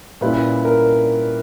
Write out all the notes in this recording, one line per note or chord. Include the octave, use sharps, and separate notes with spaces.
A#2 G3 C#4 E4 B4
A#4